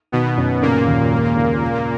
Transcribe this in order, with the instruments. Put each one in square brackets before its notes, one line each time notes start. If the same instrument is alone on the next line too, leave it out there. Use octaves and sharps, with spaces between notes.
[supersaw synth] B2 B3 [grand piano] D#3
[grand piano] F#2
[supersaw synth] A#2 A#3 [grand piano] C#3
[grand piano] D#2
G#3
C#3
A#2